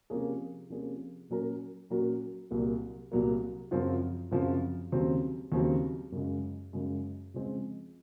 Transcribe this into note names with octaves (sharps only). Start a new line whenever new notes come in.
C3 F3 A#3 C#4 G#4
C3 F3 A#3 C#4 G#4
A#2 F#3 C#4 F#4 A#4
A#2 F#3 C#4 F#4 A#4
C2 A#2 F#3 A#3
C2 A#2 F#3 A#3
F#2 C#3 F3 C4 F4
F#2 C#3 F3 C4 F4
D#2 C#3 F#3 C4
D#2 C#3 F#3 C4
F#2 C#3 G#3
F#2 C#3 G#3
C#3 F3 G#3 C4